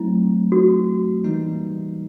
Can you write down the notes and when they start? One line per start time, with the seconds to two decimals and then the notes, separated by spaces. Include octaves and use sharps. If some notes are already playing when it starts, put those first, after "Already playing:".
Already playing: F#3 A3 C4 E4
0.52 F#4
1.24 E3 G3 A#3 D#4